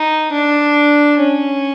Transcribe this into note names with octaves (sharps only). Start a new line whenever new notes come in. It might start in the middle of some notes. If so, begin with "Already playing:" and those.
Already playing: D#4
D4
C#4